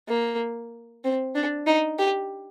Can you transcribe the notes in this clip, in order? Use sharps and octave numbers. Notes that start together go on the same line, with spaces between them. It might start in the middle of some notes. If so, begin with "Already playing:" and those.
A#3
C4
D4
D#4
G4